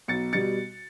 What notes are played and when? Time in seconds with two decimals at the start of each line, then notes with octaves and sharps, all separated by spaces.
0.08 B1 A6 C#7
0.33 B2 G3 A6 C#7